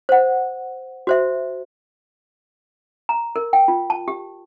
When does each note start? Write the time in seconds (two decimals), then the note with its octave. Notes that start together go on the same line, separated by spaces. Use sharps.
0.09 C5 F#5
1.07 F#4 C5 E5
3.09 A#5
3.36 A#4
3.53 G5
3.68 F4
3.90 A5
4.08 G4